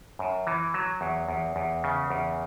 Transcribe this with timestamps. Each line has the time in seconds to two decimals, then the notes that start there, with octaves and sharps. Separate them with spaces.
0.19 F#2
0.47 E3
0.74 F#3
1.01 E2
1.29 E2
1.56 E2
1.84 C#3
2.11 E2